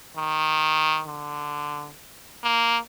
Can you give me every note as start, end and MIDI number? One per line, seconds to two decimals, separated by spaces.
0.16 1.02 51
1.07 1.92 50
2.43 2.77 58